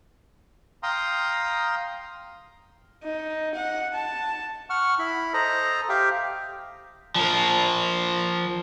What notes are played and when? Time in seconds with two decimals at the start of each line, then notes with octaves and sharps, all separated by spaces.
0.83 F5 G5 A#5 C6 D#6
3.03 D#4
3.55 F#5
3.94 A5
4.70 F#5 C#6 F6
4.99 E4 B5
5.34 A4 C5 D#5 A#5
5.89 G4 E5 F5 G5
7.16 F3 A#4